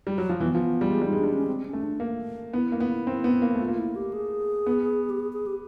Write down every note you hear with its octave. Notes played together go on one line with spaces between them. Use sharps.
G3
F#3
F3
E3 B3
F3
G3
G#3
G3 D#4
G#3
G3 D4
C#4
C4
C#4
A3
D4
A#3
B3 E4
A#3
B3
C4
B3
A#3
A3 F4
A#3
E4
G4
G#4
B3
G4
G#4
G#4
G4